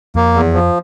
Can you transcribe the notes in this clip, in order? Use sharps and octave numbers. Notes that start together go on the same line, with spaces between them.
F2 A#3
E2
F3